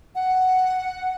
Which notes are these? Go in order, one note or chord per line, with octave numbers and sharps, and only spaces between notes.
F#5